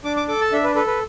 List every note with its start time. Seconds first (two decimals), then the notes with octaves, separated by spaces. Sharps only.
0.04 D4 D6
0.17 D6
0.28 A4 D6
0.41 A5
0.52 D4 E5
0.64 B4
0.75 A4 B4
0.87 B4